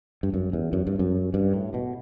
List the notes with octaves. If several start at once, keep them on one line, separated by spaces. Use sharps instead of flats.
G2
F#2
E2
F#2
G2
F#2
G2
A2
B2